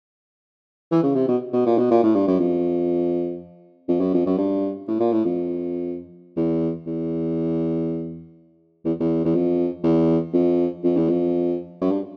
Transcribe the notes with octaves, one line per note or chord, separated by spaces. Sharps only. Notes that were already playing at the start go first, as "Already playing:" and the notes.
E3
C#3
C3
B2
B2
A#2
B2
A#2
A2
G2
F#2
F2
F2
F#2
F2
F#2
G2
A2
A#2
A2
F2
E2
E2
E2
E2
E2
F2
E2
F2
F2
E2
F2
F#2
G2